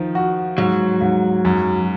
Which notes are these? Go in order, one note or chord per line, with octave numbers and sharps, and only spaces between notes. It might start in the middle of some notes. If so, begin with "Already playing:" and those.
Already playing: D#3 F3
F#4
G#2 F#3
G#2
F#2